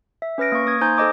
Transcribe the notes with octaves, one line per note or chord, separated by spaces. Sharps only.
E5
C#4 B4 F6 A#6 D7
A#3 C#6
A#3 D#6 G#6
D#4 C5 G#5 A#5 C6 G6
A4 C5 D#5 D6 D#6